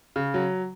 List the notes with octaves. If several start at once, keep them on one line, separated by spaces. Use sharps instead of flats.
C#3
F#3